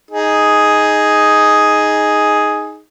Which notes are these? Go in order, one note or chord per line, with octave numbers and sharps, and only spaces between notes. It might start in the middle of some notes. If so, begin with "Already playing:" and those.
D#4 G#4